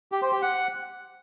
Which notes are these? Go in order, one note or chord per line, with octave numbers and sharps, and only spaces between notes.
G4
C5
G4
F#5